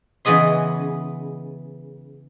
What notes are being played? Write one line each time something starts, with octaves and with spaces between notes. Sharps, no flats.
C#3 E3 B3 G#4 D#5 C6